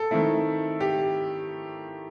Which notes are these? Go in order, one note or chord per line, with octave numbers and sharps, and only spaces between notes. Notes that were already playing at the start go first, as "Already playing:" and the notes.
Already playing: A4
D#3 A3 C4 E4
G4